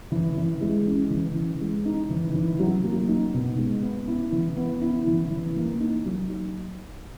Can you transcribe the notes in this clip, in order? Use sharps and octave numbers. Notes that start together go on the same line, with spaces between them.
E3
E3
G#3
C#4
E3
E3
G#3
D#4
E3
E3
F#3
A#3
D#4
B2
G#3
B3
E4
E3
B3
E4
E3
E3
A#3
D#4
F#3